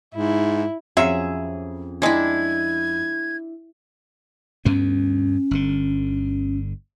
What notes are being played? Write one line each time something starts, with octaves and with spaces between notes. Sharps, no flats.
G#2 E4
F2 F#3 C#4 F4 G#4 E5
G3 G#3 D4 E4 G#6
D2 G2 B3 C#4
G1 D3